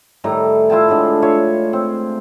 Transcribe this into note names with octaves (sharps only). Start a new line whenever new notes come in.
A2 D#3 G3 A#5
E4 F4 G5 A5
A2 D3 G#3 D4
F4 C#5 E5
C4